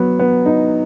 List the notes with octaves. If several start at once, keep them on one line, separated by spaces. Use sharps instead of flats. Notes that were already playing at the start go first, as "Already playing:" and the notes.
Already playing: F#3 B3
B3
D#4